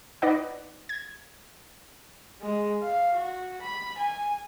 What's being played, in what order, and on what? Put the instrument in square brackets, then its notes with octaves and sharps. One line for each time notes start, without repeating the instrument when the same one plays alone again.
[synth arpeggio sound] D#4 B4 D5 D#5 F#5
G#6
[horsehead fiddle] G#3
F5
F#4
B5
G#5